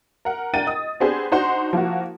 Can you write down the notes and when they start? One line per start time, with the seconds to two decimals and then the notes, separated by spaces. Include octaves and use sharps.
0.25 A#4 F#5
0.53 D4 A#4 F#5 G5 A6 D#7
0.66 D#5 D#6
1.00 B3 C4 D4 G4 G#4 C5
1.31 D4 D#4 F#4 C5 F#5 C6
1.73 F3 A#3 E4 F#4